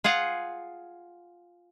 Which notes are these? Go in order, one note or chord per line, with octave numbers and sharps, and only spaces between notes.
F4 G#4 F5 F#5